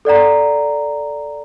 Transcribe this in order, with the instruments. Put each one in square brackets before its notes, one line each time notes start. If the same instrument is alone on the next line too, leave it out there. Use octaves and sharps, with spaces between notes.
[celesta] A4 D5 F#5 A#5